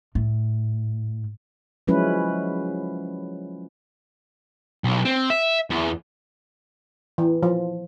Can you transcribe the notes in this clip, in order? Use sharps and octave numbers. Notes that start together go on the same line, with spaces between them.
A2
F3 F#3 G#3 C#4 E4 B4
B1
C4
E5
E2
E3
F3